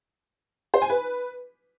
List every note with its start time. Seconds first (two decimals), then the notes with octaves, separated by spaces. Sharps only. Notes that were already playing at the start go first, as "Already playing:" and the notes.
0.74 C5
0.82 G#5
0.90 B4